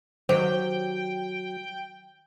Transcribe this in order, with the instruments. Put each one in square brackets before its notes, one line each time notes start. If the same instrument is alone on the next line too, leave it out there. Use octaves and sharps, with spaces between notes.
[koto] D#3 G4 [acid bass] F#3 [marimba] C5 [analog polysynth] G5